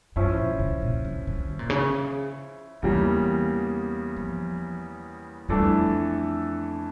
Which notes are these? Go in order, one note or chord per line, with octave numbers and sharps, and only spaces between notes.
G2 F3 C#4 E4
A#2
C#3
A#2
C#3
D3
C#3
A#2
C#3
E2 C#3 E3 G3 A#3
F3
F2 E3 G3 A3 D4 A4